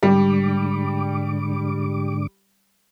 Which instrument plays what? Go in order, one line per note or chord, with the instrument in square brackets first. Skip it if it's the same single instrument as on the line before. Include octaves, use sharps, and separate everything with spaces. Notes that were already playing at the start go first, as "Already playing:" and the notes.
[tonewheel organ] G#2 D3 D6 [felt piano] G3